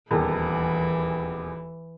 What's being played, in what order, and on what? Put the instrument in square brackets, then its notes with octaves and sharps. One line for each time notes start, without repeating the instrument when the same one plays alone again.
[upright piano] D#1 E2 D#3 [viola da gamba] E3